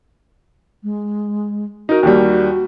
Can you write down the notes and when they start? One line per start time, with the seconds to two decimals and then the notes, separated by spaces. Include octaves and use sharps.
0.83 G#3
1.89 D#4 F#4 A#4
2.03 D#2 D#3 G3